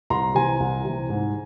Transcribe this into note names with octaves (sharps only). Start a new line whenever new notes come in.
C2 A#5 C6
C3 E3 G#5 A#5
C2
C3 E3
G#2